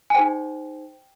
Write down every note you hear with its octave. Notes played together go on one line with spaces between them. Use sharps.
G#5
D#4 G#4 C5 G5